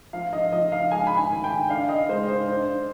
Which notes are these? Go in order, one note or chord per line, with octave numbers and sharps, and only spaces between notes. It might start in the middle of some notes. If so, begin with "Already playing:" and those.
F3 F5
D#5
F3 D#5
F5
G#3 G#5
B5
G#5
D#3
G5
D4 F5
D#5
G#3 C5
C5
D4 C5